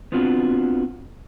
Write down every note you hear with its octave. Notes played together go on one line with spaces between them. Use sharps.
B3 C4 D4 F4 F#4